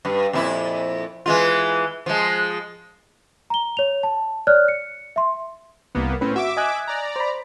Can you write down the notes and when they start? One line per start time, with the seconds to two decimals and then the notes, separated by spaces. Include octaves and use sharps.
0.05 G2
0.33 F2 A#2 E4
1.26 E3 G#3 F4
2.06 F3 G#3
3.50 A#5 G7
3.77 C#5 F7
4.03 A5
4.47 C#5 D5 F6 F#6
4.68 C#7
5.16 E5 C6
5.95 C2 A#3 B3
6.21 A2 C4 C#4 B4
6.36 F#4 E5 D6
6.57 D#5 G#5 F#6
6.88 D5 A#5
7.16 C5 B5